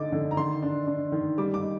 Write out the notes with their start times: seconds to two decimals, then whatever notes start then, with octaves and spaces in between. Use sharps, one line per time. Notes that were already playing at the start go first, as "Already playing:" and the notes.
Already playing: D3 D#4 D6 A6
0.12 D3
0.31 A#5
0.37 D#3 C6
0.63 D4
0.87 D4
1.12 D#3
1.38 G3 D6
1.54 D6
1.62 D#4